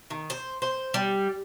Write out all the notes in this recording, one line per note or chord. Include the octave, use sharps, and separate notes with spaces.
D#3
C5
C5
G3